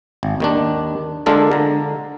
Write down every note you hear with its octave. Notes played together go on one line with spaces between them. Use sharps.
G#1
D#2 D#3 D4
D3 G#3 D4 F4 A4 A#4
D3 A#5